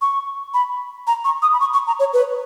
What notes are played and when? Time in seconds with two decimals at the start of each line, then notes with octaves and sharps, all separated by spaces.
0.02 C#6
0.54 B5
1.07 A#5
1.25 C#6
1.42 D#6
1.53 B5
1.60 C#6
1.73 C#6
1.87 A#5
2.00 C#5
2.13 B4